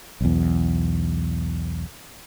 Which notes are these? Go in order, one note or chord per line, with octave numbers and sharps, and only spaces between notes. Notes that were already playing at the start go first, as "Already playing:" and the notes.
B1 E2